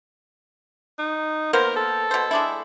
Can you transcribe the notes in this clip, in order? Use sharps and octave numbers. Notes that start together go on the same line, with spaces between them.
D#4
A#3 B3 A#4 C5
A4
B2 C5
G#3 D4 E4